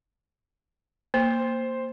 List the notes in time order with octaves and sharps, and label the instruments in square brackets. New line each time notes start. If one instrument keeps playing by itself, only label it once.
[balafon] A#3 [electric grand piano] C5